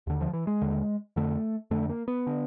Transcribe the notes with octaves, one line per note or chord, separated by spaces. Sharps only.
D#2 D3
F3
E3
G#3
D#2 D3
F2 D3 A3
F2 D3 A3
A#3
B3
D3